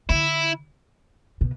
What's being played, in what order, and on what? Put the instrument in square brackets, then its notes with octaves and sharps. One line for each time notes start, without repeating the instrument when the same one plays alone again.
[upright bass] D3 [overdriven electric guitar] E4
[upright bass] B2